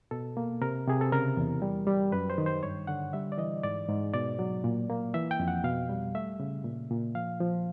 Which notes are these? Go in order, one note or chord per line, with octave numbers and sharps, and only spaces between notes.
B2 A4
A#3
C3 A#4
C3 G#4
A4
C#3 A#4
E2
G3
G3
F#2 B4
C5
D#3
C5
G2 C#5
D3 F#5
G3 E5
D5
E3 D#5
G#2 D5
G#2
B2 D5
F#3
A#2
A#3
E3 E5
G5
F2
F#5
B2 F5
G3
A3 E5
C#3
A#2
A#2
F3 F5
F3